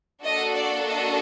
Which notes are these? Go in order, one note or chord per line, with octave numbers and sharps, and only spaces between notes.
A#3 D4 F#4 A4 D#5
D5
D#5